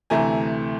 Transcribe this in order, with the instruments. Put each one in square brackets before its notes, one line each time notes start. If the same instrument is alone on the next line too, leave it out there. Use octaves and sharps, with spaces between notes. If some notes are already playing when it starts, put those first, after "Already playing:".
[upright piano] D2 C3 E3 A3 G#5 A#5